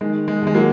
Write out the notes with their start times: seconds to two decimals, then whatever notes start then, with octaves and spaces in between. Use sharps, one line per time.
0.01 D#3 G#3
0.28 G#3
0.42 D#2 G#3
0.54 F#3 A#3